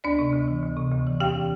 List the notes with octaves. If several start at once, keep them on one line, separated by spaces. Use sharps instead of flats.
D2 D4 D5
C3
D2
E3
D2
C3
D2
E3
E2 G4 G5
E3